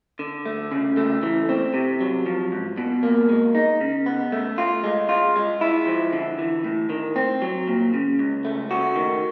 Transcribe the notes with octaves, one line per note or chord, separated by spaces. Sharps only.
D3
A3
C#3
A3
E3
C4
C3
F#3
F3
G#2
B2
A#3
G#3
D#4
C#3
B3
A3
F4
G#3
F4
G#3
E4
F3
D3
E3
A2
D#3
C4
F#3
A#2
C#3
C#2
A3
F#4
D#3